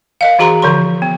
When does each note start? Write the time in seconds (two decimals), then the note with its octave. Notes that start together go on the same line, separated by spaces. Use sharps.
0.21 A#4 D#5 F5
0.39 E3 F#4 G#4 A#5 C6
0.62 D3 F3 C6
1.02 B3